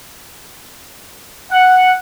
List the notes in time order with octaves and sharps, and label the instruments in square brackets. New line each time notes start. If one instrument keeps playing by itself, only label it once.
[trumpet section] F#5